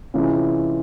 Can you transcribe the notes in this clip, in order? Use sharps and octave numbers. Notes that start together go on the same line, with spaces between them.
C3 E3 G#3 C#4 F4